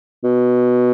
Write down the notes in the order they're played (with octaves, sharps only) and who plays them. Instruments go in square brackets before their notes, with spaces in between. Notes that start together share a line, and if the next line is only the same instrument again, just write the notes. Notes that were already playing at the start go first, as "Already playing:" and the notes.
[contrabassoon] B2